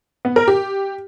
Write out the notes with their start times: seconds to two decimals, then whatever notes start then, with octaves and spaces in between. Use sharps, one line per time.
0.25 B3
0.36 A#4
0.48 G4